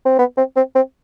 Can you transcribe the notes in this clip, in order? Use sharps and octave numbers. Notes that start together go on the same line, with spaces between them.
C4
B3
C4
C4
C4